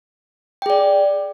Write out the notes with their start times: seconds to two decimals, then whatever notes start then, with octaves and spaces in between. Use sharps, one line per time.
0.62 G5
0.66 G#4
0.70 D5